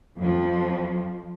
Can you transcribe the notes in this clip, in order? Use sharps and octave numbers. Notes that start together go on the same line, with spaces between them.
F2 F3